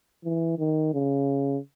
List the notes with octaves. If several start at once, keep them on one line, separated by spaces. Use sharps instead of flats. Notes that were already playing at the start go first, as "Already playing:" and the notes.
E3
D#3
C#3